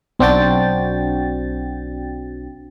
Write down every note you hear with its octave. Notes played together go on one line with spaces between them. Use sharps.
B1 C4 D4 F#4 G5 A6